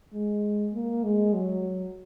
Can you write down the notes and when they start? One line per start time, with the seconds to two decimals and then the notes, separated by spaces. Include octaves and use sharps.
0.14 G#3
0.74 A#3
1.04 G#3
1.34 F#3